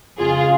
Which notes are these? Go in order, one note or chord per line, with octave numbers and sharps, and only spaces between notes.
F2 C#3 G#3 F4 G#4